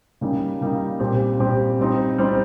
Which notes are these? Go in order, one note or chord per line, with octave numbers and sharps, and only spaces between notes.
C#3 G3 A#3 D#4
C#3 G3 A#3 D#4
A#2 G3 C4 G4
A#2 G3 C4 G4
G3 C4 D#4
G3 C4 D#4